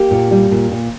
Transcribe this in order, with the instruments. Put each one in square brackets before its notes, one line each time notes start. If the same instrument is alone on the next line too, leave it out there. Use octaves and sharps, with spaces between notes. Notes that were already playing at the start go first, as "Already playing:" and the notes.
Already playing: [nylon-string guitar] A#3 G4
A#2
G3
A#2
A#2